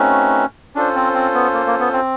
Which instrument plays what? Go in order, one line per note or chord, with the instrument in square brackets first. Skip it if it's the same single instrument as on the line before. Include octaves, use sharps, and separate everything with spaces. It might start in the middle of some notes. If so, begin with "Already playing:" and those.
Already playing: [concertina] A3 C4 D#4 F#4 B4 [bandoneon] C#4
[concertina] C#4 F4 A4 C5 [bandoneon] D4
[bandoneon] C4
C4
B3
A#3
A#3
B3
C4